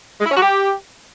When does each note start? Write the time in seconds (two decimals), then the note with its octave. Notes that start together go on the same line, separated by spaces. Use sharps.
0.21 G#3
0.26 E4
0.32 C#4
0.37 F#4
0.42 G4